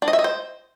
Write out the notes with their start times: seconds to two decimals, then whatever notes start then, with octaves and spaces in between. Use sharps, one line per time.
0.02 D4
0.08 D#5
0.13 E5
0.19 D#5
0.24 C5